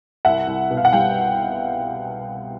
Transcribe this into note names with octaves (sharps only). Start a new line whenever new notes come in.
C2 E5 F#5
C2
B2
F5
F#5
G3 F5 G5